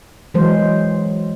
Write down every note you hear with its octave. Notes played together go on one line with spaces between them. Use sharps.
E3 F#3 G#3 C5